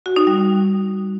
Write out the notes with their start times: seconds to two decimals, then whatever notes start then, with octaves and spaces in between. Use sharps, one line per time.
0.06 F#4
0.16 D#4
0.27 G3